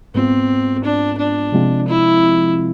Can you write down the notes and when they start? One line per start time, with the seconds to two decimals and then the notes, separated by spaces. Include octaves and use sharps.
0.15 G#2 G#3 B3 C4 F4
0.84 D4
1.18 D4
1.52 C3 F3 G#3 C4 F4
1.88 E4